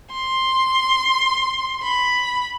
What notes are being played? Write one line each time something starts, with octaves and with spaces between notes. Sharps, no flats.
C6
B5